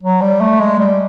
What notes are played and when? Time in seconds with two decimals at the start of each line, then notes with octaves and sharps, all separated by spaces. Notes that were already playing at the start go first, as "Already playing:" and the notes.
0.03 F#3
0.22 G3
0.41 A3
0.60 G#3
0.79 G3